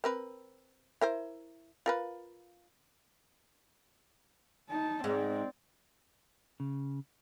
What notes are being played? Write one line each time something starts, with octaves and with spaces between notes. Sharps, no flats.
C4 A#4 B4
E4 A#4 C5
F4 A#4 B4
D#4 A5
G#2 C4 D5
C#3